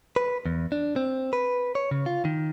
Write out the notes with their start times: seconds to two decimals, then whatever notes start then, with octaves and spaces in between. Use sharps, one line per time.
0.16 B4
0.46 E2
0.72 D4
0.96 C4
1.33 B4
1.75 C#5
1.91 C#3
2.06 F4
2.25 D#3